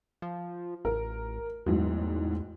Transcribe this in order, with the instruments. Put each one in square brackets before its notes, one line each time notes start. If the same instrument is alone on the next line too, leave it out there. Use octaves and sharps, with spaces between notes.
[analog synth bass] F3
[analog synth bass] A1 [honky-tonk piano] A#4
[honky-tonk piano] A1 G#2 F#3 [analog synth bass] E2